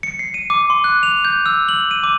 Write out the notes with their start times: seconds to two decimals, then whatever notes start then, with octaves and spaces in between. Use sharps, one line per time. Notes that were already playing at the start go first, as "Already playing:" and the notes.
0.03 C#7
0.19 C7
0.34 D#7
0.50 D6
0.70 C6
0.84 F#6
1.03 F7
1.25 G6
1.46 E6
1.68 F#7
1.91 D#7
2.04 D6